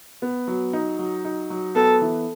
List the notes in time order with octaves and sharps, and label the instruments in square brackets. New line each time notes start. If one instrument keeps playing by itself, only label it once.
[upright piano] B3
F#3
D#4
F#3
D#4
F#3
[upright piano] B3 [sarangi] A4
[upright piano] E3